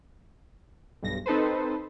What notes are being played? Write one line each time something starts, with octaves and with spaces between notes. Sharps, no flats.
B1 G2 A#6
C4 D#4 A4 B4 C5